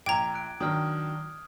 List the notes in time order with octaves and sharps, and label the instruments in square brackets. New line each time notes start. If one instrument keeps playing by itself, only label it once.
[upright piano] A#1 [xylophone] G5 A#5 [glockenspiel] D6 G#6
[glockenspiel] F#6 D7
[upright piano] D#3 F#3 D4 [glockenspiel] D#6 F6